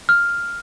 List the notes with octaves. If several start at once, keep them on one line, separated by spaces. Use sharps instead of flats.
F6